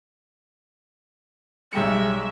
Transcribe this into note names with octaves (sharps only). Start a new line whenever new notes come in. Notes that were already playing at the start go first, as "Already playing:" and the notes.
B1 G3 G#3 G4 E5 C#7